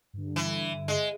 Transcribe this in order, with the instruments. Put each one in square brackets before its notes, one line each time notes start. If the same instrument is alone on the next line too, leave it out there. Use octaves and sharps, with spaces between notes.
[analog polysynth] G2 D3
[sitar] E3
G#3